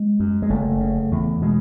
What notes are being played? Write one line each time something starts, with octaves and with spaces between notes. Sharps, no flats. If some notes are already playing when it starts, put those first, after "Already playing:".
Already playing: G#3
F#2
G#3
F#1 A3
C#3
E2
B2 G#3